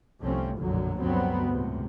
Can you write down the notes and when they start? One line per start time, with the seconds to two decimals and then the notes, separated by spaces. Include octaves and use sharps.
0.19 G1 C2 F3 A3 C4 C#4
0.58 F1 B1 F#2 A#2 D3 F#3
0.99 D2 G2 F#3 B3 C4
1.48 C#2 F#2 A2 C3